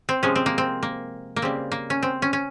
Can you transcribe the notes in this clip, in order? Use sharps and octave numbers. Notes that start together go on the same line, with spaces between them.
C4
C3 F3 G#3 C#4
C4
A#3
C4
A#3
A#3
C#3 G3 C4
A#3
C#4
C4
C#4
C#4